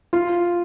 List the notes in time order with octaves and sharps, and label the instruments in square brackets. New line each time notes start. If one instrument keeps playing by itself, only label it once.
[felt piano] F4